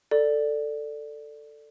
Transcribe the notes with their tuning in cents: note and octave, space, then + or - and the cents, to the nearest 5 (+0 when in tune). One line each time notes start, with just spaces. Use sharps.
A4 +10 D5 +5